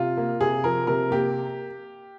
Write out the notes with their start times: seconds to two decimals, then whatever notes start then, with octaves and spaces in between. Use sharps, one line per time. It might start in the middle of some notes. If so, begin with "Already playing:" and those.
Already playing: C3 F4
0.17 A#3
0.41 C3 G#4
0.64 F3 A#4
0.87 C3 A#4
1.11 A#3 G4